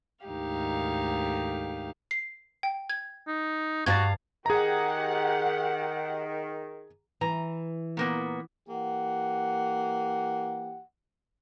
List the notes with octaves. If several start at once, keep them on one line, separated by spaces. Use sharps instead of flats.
D2 G#2 D#3 D#4 G4 F5
C7
G5
G#6
D#4
G2 F#4 F5 A#5 G#6 A6
D#3 G4 G#4 F#5 A#5
E3 A#5
A#2 A#3 B3
E3 A#3 G4 F#5